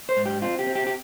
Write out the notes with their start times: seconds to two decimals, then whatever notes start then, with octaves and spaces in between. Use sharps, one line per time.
0.09 C5
0.17 G#2
0.26 G4
0.42 C4 F4
0.59 G4
0.67 C4
0.75 G4
0.87 G4